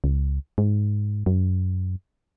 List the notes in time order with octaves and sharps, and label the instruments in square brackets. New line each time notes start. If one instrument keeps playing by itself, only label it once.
[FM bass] C#2
G#2
F#2